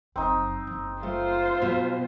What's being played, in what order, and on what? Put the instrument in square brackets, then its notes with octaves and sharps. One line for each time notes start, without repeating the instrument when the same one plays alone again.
[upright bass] F#1 F#2 [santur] C4 D#4
[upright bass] F#1
[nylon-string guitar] A3 [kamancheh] F4 C5
[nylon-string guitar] B2 [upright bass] F3 F#3